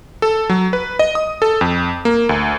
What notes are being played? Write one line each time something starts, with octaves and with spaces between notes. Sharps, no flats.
A4
F#3
B4
D#5
D#6
A4
F2
A#3
D2